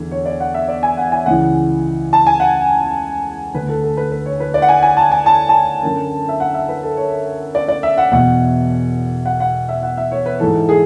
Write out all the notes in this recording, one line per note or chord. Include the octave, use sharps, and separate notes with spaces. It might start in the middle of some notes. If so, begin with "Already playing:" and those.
Already playing: E2 D3
C#5
D5
F#5
E5
D5
G#5
F#5
G#5
C#2 C#3 E3 F#5
A5
G#5
F#5
D2 D3 B4
A4
A4
B4
B4
C#5
B4
D5
F#5
G#5
G#5
A5
G#5
A5
A5
F#2 D3
E5
F#5
E5
B4
A4
C#5
D5
D5
E5
F#5
E2 B2 F#5
F#5
F#5
E5
F#5
E5
C#5
B4
G#2 E3 A4
G#4